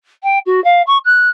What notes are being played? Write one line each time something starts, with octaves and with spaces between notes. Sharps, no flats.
G5
F#4
F5
C#6
F#6